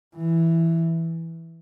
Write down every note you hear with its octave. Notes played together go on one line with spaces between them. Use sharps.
E3